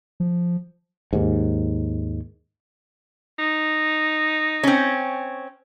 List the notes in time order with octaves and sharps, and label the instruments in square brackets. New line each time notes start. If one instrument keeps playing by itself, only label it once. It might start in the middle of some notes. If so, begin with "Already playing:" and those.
[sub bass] F3
[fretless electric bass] D#2 G#2
[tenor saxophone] D#4
[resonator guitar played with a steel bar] C4 C#4